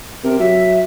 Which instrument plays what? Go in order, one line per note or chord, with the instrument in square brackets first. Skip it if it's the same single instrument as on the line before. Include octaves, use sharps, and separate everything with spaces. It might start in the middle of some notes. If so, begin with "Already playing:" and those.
[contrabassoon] C3 [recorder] A#4
[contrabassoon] F#3 [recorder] E5